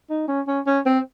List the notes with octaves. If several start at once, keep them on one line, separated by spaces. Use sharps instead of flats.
D#4
C#4
C#4
C#4
C4